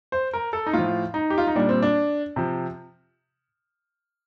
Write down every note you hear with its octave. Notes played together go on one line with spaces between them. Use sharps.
C5
A#4
A4
D#4
A2 F3 F4
D#4
G4
F4
D#4
A#2 G3 D4
C4
D4
C3 F3